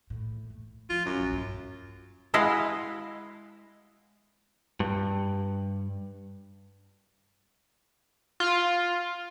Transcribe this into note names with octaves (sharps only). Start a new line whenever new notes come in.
E2 A2
A3
F3 F4
F#2 E4
A#1
G2
G#3 E4 D#5 F5 F#5
G2
F4